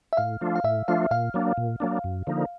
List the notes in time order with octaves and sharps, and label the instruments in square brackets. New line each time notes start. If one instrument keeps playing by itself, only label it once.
[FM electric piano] E5
[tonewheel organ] A2 [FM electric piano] F5
[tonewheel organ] F3 A3 D4 F4
[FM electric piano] F5
[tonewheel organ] A2 [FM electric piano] E5
[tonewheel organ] F3 A3 D4 F4 [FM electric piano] F5
[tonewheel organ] A#2 [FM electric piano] F5
[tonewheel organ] F#3 A#3 D4
A#2
F#3 A#3 D4
F#2
D3 F3 A#3 D#4